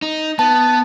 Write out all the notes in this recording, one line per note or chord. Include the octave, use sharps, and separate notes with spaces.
D#4
B3 A5